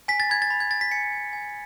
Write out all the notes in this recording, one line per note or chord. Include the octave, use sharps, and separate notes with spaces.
G#5 B6
A6
B5 G#6
A6
B5
G#6
G#5 A6
B6
G#5 C#7
G#5
G#5